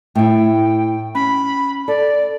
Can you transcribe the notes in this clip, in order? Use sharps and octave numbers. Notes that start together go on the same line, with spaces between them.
A2 E4 G5
C#4 B5
A4 D5